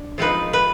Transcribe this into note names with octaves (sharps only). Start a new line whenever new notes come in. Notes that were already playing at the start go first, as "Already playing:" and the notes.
Already playing: D4
F3 G#3 C4 D#4 B4
B4